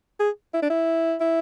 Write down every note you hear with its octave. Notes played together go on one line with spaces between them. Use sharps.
G#4
E4
D4
E4
E4